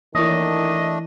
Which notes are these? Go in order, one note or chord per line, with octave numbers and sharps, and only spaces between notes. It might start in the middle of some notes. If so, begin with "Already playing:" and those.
D#3 E3 A3 D4 E4 D#5